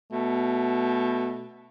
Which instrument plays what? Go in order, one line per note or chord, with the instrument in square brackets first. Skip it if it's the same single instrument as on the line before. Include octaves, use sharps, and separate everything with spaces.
[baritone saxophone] B2 [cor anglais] A3